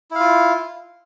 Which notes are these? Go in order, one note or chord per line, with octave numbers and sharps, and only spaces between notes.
E4 F4 F5